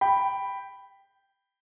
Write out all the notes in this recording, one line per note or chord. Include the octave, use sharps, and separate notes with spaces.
G5 B5